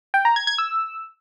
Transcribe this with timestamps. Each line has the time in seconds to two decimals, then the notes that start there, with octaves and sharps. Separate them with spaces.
0.14 G5
0.25 A#5
0.36 G#6
0.47 G#6
0.58 E6